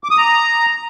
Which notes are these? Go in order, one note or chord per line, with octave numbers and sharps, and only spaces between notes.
D6
D#6
A#5